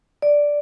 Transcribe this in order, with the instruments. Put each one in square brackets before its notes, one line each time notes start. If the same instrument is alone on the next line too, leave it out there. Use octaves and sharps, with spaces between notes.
[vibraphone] D5